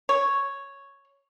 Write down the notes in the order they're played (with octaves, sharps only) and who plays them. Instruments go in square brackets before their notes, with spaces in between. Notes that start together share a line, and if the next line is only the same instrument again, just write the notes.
[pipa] C#5